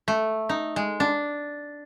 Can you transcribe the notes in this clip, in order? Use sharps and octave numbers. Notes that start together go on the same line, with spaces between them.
A3
D#4
G#3
D4